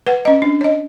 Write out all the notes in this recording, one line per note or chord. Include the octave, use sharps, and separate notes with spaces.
B4 F#5
C#4 D#5
D4
C#5 D#5